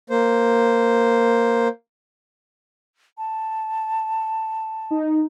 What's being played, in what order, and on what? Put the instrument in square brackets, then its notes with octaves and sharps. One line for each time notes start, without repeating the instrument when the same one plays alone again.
[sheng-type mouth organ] A#3 C5
[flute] A5
[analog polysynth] D#4